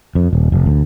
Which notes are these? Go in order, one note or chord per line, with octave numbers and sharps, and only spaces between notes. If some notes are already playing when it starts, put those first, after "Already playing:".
F2
D#1
F1
D2